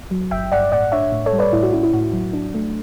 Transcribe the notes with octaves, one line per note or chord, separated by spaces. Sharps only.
F#3
G1 E5 G5
G2 D5 F#5
A2 D5 F#5
D4 C#5 E5
A2
A4 C#5
G3
B4 D5
A2 E4
F#4
C#4 E4
E4
A2 F#4
F#3
D4
A3